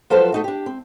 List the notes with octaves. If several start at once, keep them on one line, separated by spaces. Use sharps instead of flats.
F3 F#3 F4 A4 B4 C5
A3 D#4 F#4
D4 G4
C4